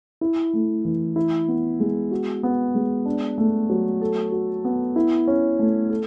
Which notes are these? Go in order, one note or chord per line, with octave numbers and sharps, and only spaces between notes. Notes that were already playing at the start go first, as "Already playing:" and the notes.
E4
A3
E3
E4
B3
G#3
F#4
B3
G#3
D4
A3
F#3
A4
F#4
B3
E4
C#4
A3
A4